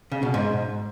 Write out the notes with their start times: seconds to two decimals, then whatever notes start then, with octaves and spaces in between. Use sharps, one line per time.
0.12 C#3
0.23 B2
0.34 G#2